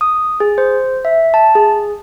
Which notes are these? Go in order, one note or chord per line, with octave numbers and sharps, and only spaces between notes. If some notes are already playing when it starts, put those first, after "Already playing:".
D#6
G#4
C5
E5
A5
G#4